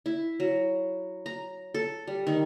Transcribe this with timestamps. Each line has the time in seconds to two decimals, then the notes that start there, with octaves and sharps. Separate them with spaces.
0.06 E4
0.40 F#3
1.26 A#5
1.74 A4
2.07 G3
2.27 D#3